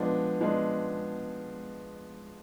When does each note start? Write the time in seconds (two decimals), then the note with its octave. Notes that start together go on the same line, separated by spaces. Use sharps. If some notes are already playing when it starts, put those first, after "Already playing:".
Already playing: F3 G#3 B3 D4
0.41 F3 G#3 B3 D4